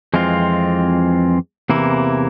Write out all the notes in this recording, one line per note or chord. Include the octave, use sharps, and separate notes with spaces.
F2 E3 G#3 C4 F4
E2 C3 E3 A#3 E4